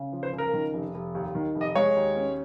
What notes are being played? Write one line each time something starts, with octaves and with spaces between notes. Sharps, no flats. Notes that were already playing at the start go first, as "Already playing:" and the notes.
Already playing: C#3
F3
C5
C#2
A#4
D#3
F1
F1
D#2
D#3
F1
D#5
G#3 C#5
D#2
C#4